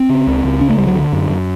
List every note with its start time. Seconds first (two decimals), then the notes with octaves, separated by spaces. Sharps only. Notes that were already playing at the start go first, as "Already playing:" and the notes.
Already playing: C4
0.09 C#3
0.27 C#2
0.45 C#2
0.61 C#3 C#4
0.70 A3
0.78 C#2 G3
0.87 F#3
0.96 D3
1.13 F#2
1.30 F#2